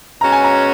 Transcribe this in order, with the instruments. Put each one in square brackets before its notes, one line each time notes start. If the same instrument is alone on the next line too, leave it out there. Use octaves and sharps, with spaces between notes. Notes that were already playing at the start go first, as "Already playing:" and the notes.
[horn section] B2 G#3 C#4 F#4 [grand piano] A#5
[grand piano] G#5
A#5